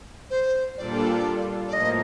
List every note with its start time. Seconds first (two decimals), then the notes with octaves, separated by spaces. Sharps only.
0.30 C5
0.77 A#2 G3 D4 F4 A4 D5
1.67 D5
1.73 A2 F3 A#3 D#5